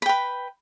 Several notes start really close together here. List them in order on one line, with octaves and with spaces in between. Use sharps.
B5 G5 B4